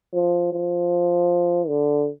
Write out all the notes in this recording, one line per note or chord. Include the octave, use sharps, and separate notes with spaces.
F3
F3
D3